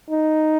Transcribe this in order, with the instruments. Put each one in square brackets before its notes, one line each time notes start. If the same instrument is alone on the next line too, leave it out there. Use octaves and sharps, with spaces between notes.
[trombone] D#4